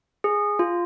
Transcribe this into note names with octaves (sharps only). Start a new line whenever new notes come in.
G#4
F4